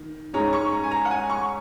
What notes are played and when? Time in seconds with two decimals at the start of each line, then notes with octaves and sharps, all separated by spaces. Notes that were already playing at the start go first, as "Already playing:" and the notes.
Already playing: D#3
0.33 G#2 G#3 C#4 A#5
0.53 C#6
0.72 A#5
0.84 G#5
0.91 A#5
1.05 F#5
1.11 G#5
1.30 C#6